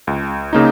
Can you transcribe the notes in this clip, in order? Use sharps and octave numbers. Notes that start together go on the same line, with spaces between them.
C#2
C#3 A#3 D#4